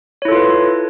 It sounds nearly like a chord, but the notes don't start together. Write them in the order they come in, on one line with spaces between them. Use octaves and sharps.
C#5 E4 A4 F4 B4